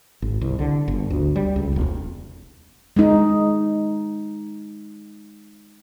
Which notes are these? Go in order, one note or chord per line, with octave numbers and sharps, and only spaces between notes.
G#1
C2
D3
G1
D2
G3
C#2
E1
G#3 D#4